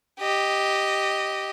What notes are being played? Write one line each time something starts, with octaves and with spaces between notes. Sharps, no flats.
G4 D#5